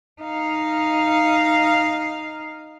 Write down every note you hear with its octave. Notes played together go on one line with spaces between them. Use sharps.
D#4 F5